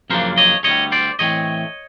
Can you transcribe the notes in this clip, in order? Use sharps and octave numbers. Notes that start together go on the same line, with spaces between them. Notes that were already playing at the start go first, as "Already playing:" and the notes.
F#2 C#3 F3 A#3 D4 A#4 C5
C#5 D#5
D2 D3 G3 C#5 D#5
C5 D5
A2 E3 A3 C4 C#5 D#5